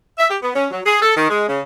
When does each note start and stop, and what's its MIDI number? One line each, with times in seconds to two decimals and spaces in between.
0.18 0.30 76
0.31 0.38 67
0.42 0.51 59
0.56 0.67 61
0.71 0.81 54
0.86 0.98 68
1.02 1.13 69
1.17 1.27 51
1.30 1.46 56
1.49 1.62 49